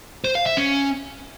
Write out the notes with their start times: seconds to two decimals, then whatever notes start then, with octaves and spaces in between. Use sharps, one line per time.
0.24 C5
0.35 F5
0.46 E5
0.57 C#4